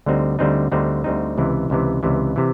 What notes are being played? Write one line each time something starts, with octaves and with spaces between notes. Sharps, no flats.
D2 D3 G3 C4 D#4
D2 D3 G3 C4 D#4
D2 D3 G3 C4 D#4
D2 D3 G3 C4 D#4
C#2 C3 E3
C#2 C3 E3
C#2 C3 E3
C3 E3